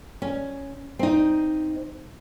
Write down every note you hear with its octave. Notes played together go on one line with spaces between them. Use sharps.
C#4
C4 D#4